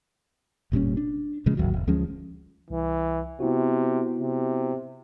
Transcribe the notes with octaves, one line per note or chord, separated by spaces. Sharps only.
F1 A#2 G3 C#4
D4
A#2 C#3 F3 G#3
D1 G#1 D#2 F#3
E1
D2 F3 G#3 C#4
C2 E3
C3 B3 E4 F#4
C3